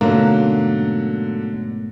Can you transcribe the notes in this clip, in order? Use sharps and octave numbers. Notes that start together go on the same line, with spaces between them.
G#2 B2 D3 F#3 A3 A#3